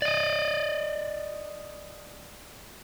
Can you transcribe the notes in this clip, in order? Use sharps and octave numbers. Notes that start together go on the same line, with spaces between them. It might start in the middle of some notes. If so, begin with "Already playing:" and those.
D5 D#5